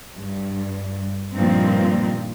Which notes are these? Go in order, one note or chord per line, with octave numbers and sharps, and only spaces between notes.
G2
G2 A#2 D#3 F3 C4